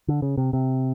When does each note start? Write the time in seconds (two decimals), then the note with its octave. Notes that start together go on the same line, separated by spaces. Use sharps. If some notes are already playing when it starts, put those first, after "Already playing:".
0.08 D3
0.22 C#3
0.37 C3
0.53 C3